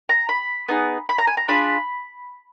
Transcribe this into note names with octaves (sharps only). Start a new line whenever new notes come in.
A#5
B5
B3 D#4 G#4
B5
A#5
G#5
A#5
D4 F4 G#4 B5